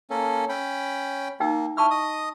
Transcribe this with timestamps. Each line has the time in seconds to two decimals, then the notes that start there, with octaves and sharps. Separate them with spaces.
0.10 A#3 C#4 A4
0.49 C#4 G5 B5
1.40 A#3 D#4 G5 E6
1.77 E4 A5 C#6 E6 F6
1.91 D#5 D#6